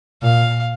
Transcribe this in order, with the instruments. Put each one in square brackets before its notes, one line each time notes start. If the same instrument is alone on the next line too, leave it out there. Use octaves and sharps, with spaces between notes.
[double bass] A#2 [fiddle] F5